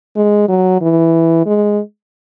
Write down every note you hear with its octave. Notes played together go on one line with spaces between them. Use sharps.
G#3
F#3
E3
G#3